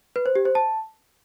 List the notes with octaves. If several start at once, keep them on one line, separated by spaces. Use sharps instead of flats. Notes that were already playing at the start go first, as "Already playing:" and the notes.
B4
C5
G4
C5
A5